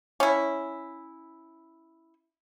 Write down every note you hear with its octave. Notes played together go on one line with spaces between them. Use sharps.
C#4 E4